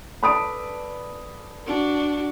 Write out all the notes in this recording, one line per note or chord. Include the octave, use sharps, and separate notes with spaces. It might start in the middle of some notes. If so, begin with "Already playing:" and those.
A4 B4 D5 B5 D#6 D7
D4 F#4